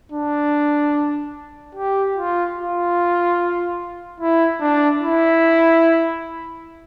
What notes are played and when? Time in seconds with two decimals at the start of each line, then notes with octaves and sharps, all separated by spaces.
0.12 D4
1.75 G4
2.16 F4
2.57 F4
4.20 E4
4.61 D4
5.01 E4